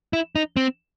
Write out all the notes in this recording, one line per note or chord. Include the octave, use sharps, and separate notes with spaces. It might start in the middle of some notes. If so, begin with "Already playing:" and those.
E4
D#4
C4